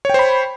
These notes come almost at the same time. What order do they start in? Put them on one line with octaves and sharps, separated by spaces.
C#5 G5 C5 B5